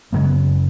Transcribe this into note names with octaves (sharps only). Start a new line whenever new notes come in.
F#2 C#3 G#3 A#3
B3